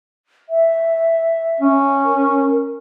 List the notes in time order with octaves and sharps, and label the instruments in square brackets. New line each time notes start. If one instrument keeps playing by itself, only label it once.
[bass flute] E5
[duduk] C#4
[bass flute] A#4